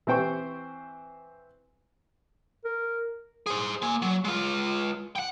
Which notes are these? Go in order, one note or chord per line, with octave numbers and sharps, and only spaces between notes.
E3 C4 C5 G5 C#6
A#4
G#4 C5
A#3 G#5
F#3
G#3 F4
F#5 G5